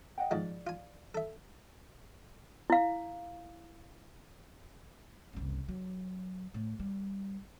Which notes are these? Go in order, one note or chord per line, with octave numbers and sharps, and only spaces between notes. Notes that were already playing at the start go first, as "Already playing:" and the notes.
D#5 F#5 G5
G#2 F3 G#3 D5
F4 G#5
A4 E5
E4 F5
F#1 C2
F#3
A2
G3